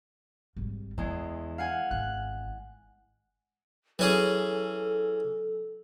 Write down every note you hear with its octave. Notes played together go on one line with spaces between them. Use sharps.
G#1 G3
E2 E3 G#3
F5 F#5 G#5
G#1 F#6
E3 F#3 C#4 G#4 A4